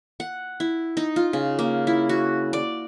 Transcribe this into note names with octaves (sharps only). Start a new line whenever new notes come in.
F#5
E4
D#4
F4
C#3
A#3
E4
F#4
D5